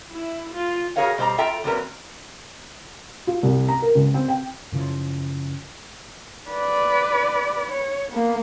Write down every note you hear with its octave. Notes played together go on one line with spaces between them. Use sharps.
E4
F4
F#4 G#4 A#4 C#5 F5 F#5
B2 G3 C5 C#5 A#5
F4 A4 E5 G5 A#5
E2 A#2 F#3 C4 A#4 B4
F4
C2
A#5
A#4
C#2
C4
G5
F#2 C#3 E3 F3
B4 D5
C#5
A#3 B3